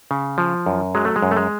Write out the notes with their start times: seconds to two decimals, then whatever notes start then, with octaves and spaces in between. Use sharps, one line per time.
0.11 C#3
0.38 F3
0.66 F#2
0.95 F#3 G#3
1.05 A3
1.16 G#3
1.23 F#2
1.31 A3
1.37 G#3